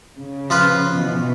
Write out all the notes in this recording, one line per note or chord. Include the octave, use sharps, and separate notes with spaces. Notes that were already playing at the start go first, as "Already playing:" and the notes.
C#3
F3 F4 B4
B2 E3